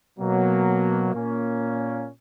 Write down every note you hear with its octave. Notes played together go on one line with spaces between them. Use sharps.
B2 F#3 A#3
A#2 A#3 C#4